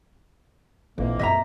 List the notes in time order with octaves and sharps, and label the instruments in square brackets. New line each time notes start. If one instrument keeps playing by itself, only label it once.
[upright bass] A#1 [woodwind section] F2 E3 A#3
[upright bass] F#2 C4 [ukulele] D#5 E5 A#5